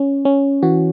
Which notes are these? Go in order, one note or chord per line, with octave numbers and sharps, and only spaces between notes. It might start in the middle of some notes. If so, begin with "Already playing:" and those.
Already playing: C#4
C#4
E3 F#4